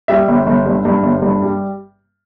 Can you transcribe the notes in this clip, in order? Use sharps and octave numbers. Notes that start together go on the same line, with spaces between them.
G3 E5
G1
G1
G2
G2
G1
G2
G3